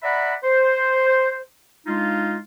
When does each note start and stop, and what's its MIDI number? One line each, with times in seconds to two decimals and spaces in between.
0.03 0.34 74
0.03 0.34 76
0.03 0.34 78
0.03 0.34 82
0.03 0.34 83
0.43 1.42 72
1.87 2.37 56
1.87 2.37 62
1.87 2.37 63
1.87 2.37 65